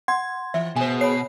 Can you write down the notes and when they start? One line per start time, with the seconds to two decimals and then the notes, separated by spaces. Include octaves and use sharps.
0.08 F#5 C6 G#6
0.54 E3 E5
0.76 B2 G#4 C5 G#5
1.01 C#5 B5 C7